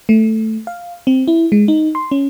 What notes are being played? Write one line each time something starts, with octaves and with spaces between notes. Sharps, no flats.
A3
F5
C4
E4
G#3
D#4
C6
C#4